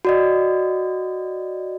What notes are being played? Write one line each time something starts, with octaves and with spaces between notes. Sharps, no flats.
F#4 D5 D#5